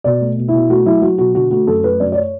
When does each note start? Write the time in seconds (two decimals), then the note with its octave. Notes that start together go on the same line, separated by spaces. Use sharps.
0.04 B2 D5
0.21 A3
0.38 B2
0.48 E4
0.54 B2
0.70 A3 F#4
0.86 F#3 E4
1.02 F#3 F#4
1.18 B2 F#4
1.35 D3 F#4
1.51 A3 F#4
1.67 F#2 A4
1.84 A3 B4
2.00 F#2 D5
2.12 D5
2.16 C#5